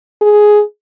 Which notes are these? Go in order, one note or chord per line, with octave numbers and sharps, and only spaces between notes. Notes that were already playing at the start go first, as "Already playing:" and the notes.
G#4